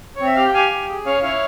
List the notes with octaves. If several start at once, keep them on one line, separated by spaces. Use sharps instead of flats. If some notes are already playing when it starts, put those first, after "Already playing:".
C4 C#5
E5
G4 F5
G5
G4 F5 G#5
G4
G#4
C#4 C#5 F5
E4 C#5 F5